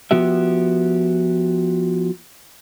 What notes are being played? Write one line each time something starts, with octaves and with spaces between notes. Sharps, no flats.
F3 B3 F#4 G4 E5